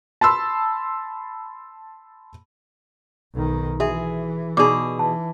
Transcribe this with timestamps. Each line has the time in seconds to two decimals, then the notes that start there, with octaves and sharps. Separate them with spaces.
0.21 A5 B5 C6 E6
3.34 B1 D#3
3.80 E3 F#4 G#4 E5
4.57 B2 D#4 G#4 D5 D6
4.99 E3 A5